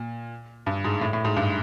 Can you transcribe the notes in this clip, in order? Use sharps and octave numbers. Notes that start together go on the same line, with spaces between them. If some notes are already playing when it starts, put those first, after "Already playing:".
Already playing: A#2
G2
G#2
A2
A2
G#2
G2